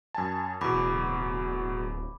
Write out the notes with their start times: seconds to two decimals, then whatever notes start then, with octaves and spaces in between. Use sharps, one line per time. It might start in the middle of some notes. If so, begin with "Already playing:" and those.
0.14 F#2 G#5 A5
0.61 E2 B2 B5 D6
0.73 D1